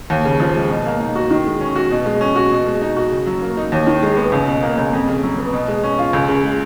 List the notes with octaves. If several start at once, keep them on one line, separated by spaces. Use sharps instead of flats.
D#2
C#3
F3
G#3
B2
A#3
D#4
F#4
D#3
G#3
C#4
F#4
B2
G#3
C#4
F#4
B2
G#3
D#4
F#4
C#3
F#3
A#3
D#4
D#2
D#3
G#3
B3
C#2
B2
A#3
C#2
F2
C#3
F#3
B3
B2
G#3
C#4
F4
C#2
C#3
G#3